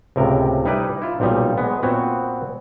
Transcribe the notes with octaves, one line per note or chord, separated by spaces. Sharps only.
C#2 A2 C3 A#4
G3 D#4 E4 B4 D5
E4 F4
B1 A#2 F3 G3 D#4
G#3 B3
A#2 B3 C4 F#4 C5 C#5